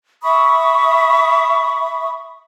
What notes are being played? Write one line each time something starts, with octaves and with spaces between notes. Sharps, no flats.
E5 B5 C#6 D#6